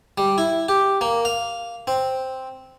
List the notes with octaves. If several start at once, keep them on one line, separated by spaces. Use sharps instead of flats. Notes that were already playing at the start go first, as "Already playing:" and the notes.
G3
E4
G4
A#3
F5
C4